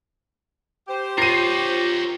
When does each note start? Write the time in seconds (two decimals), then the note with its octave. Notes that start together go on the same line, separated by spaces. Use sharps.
0.88 G4 C5
1.18 F4 A#4 C#5 C7 D#7